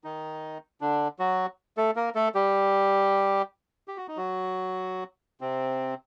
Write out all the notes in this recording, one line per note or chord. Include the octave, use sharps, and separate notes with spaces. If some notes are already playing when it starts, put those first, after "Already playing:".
D#3 D#4
D3 D4
F#3 F#4
A3 A4
A#3 A#4
A3 A4
G3 G4
G4
F#4
D#4
F#3 F#4
C3 C4